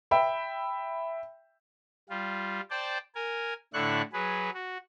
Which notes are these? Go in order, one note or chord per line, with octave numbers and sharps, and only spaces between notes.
E5 G5 B5
G3 F4
C5 D5 G5 A5
A#4 G#5
A2 D3 D4 E4 C#6 F#6
F#3 G#4 B4
F#4